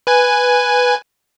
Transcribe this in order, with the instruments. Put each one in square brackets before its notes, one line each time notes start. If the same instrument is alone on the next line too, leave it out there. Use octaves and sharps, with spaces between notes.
[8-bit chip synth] B4 G#5 G#6